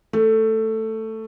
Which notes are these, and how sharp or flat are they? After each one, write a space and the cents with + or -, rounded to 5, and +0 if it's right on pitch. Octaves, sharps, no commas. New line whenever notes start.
A3 +10